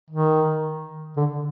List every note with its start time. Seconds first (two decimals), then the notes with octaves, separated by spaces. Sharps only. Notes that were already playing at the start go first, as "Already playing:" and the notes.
0.10 D#3
1.16 D3